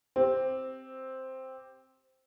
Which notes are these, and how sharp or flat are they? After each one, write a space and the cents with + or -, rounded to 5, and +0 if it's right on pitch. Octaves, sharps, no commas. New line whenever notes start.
C4 +0 G4 +0